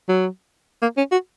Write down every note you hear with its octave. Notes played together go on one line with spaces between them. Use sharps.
F#3
A#3
C#4
F#4